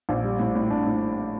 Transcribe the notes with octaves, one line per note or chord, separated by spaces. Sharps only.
A#1
G3
A2
A2
D4
A2